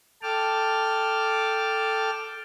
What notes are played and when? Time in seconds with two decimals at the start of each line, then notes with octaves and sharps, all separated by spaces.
0.22 A4 G5 A5 D6 F6